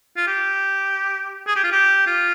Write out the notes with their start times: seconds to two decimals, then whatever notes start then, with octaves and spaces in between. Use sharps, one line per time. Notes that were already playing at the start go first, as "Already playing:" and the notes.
0.17 F4
0.27 G4
1.47 G#4
1.56 G4
1.64 F4
1.72 G4
2.07 F4